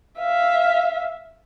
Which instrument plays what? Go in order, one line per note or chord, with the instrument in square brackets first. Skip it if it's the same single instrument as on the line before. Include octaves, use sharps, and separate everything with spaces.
[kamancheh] E5 F5